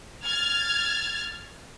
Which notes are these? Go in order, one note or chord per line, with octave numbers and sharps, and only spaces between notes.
F6 G#6 A6